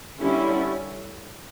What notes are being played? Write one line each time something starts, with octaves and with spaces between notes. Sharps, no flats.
D3 G3 C#4 E4